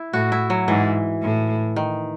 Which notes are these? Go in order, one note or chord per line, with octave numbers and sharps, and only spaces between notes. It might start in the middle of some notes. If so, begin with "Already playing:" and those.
Already playing: E4
A2 F#4
E4
F#3
G#2 E3
A2
D#3